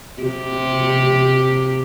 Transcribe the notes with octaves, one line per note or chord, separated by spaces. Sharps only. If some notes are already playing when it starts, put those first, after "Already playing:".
C3 G4